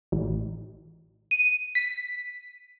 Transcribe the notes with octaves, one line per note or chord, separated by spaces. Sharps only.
A1
D#7
B6